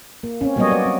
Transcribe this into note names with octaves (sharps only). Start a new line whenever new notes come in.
A#3
C4 C#4
F#3 G3 A#3 B3 C#5 D#5
D5
C4